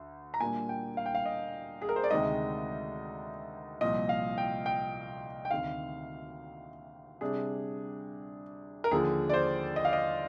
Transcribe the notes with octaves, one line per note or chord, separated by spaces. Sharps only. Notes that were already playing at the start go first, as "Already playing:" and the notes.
Already playing: D2
A#5
A#2 G3 A#3 D4 G#5
G5
F5
G5
F5
D#5
G#4
A#4
C5
D5
D2 C3 D#3 G#3 D#4 D#5
C2 A#2 F3 D#5
F5
G5
G5
G5
D2 C3 D#3 F5
C3 G3 D4 G#4
A#4
D#2 D3 F3 G#4
D5
C5
D#5
F5
D#5